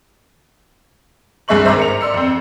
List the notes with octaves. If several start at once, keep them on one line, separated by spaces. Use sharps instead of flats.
C2 G2 G#3 E5 C#6 F#7
G#1 C5 E5 A#5 D6
A#4 C#7 F7
D5 C6 E6 C#7
F2 C4